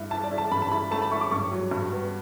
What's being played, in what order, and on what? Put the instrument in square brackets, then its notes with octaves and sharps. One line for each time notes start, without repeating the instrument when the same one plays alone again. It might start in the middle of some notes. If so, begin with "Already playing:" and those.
Already playing: [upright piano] G2 E4
E4 A5
D5
E4
A5
G2 B5
A5
E4 B5
A3 A5
B5
E4 C#6
D6
G2 C#6
F#3
G2
B3